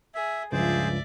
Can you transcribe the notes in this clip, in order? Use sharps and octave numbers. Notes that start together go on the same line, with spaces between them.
G#4 E5
C#2 G2 F3 G#4 C5 D5 E5